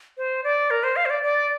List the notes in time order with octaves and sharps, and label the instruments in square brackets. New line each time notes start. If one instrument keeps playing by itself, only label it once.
[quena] C5
D5
A#4
C5
F5
C5
D5
D5